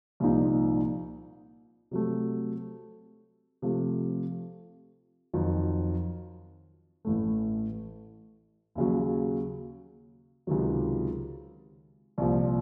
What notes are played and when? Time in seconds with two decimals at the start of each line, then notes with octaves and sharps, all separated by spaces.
0.20 C2 A#2 F3 A#3 D#4
1.91 C3 F#3 A3
3.62 C3 F3 A3
5.34 F2 D#3 F#3
7.05 A1 A2 A3
8.75 D#2 C#3 F#3
10.47 C#2 C3 D#3 F#3 C4
12.18 C2 A#2 F3